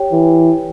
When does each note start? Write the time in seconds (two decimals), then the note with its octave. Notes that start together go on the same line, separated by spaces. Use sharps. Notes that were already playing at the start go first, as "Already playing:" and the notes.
Already playing: G4 C#5 G5
0.12 E3